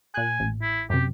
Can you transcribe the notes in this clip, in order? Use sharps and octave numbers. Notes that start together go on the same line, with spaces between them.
A#2 G#5 F#6
A1
E4
F#2 C3 G4